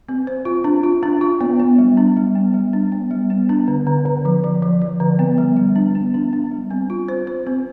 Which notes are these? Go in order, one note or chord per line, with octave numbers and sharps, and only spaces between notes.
C4
C5
F4
D4
F4
D4
F4
B3
B3
G3
D4
G3
B3
G3
D4
B3
G3
B3
D4
D3
D3
D3
F3
F3
F3
F3
D3
B3
G3
G3
D4
B3
D4
D4
G3
C4
F4
C5
C5
C4